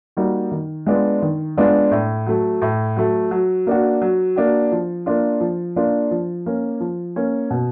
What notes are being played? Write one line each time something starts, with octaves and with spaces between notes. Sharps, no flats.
G3 A#3 D#4 F#4
D#3
G#3 B3 D4 F4
D#3
G#3 B3 D4 F4
A2
F#3 A3
A2
F#3 A3
F#3
A#3 D4 F#4
F#3
A#3 D4 F#4
F3
A#3 D4 F4
F3
A#3 D4 F4
F3
A#3 C#4
F3
A#3 C#4
B2